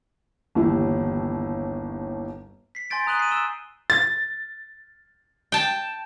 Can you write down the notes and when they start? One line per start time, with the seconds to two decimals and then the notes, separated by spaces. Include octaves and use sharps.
0.55 G1 D#2 E3 G3 E4
2.75 B6 C7
2.90 G#5 C6 G6 A6 D7
3.07 A#5 D#6 F#6 D#7 F#7 G7
3.19 C7 D#7
3.31 E6 E7 G7
3.90 A6
5.52 G5 A5